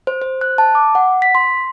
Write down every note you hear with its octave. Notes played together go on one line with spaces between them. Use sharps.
C5
C5
F#6
A5
D6
F#5
B6
C6